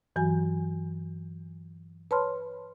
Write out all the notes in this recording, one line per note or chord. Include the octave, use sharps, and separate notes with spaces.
G2 E3 F#3 F#4 G#5
B4 C#5 A5 B5 C6 F6